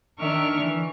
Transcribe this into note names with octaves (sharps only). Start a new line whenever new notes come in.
D#3 D4 A#4 E5 C#6 F6
D3 E3